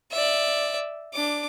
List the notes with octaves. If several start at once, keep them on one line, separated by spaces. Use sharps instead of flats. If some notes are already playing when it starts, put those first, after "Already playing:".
D5 E5
D4 D6